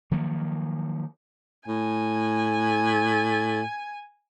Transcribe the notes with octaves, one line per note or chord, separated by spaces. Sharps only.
D#3 F3 F#3 A#3
A2 G#5